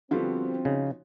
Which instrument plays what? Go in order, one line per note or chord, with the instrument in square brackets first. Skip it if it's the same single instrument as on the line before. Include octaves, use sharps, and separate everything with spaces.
[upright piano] D3 G3 B3 [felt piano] F3 F4 F#4 [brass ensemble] C4
[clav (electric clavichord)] C#3 [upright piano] D#4